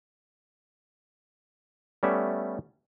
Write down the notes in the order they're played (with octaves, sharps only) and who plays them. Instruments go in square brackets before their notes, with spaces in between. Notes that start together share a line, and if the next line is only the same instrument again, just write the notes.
[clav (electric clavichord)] G3 A3 B3 C#4 D5 E5